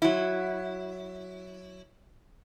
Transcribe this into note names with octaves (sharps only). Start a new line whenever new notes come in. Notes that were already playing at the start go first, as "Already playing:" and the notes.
F#3 E4